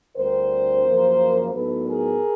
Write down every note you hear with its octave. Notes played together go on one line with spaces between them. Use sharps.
D2 D3 G3 C4 A#4 C5
F#2 C#3 F3 A#3
A2 F#3 B3 D#4 A4 B4
G#4 A#4